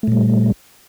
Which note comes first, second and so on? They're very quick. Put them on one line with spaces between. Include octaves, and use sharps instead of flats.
A3 A#2 G3